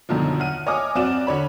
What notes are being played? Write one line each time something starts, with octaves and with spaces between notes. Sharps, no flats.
F#2 B2 D3 D#3 F3
F#5 F6 D#7
C#5 D#5 G#5 D6 D#6 F6
F#2 C4 F#4 D5 E7
D3 C#5 B5